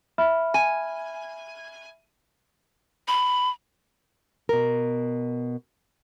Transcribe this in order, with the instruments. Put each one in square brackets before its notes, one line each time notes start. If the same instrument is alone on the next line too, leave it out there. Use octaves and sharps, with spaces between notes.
[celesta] E5 B5 F6
[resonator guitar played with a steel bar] G#5
[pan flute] B5
[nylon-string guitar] B2 A#4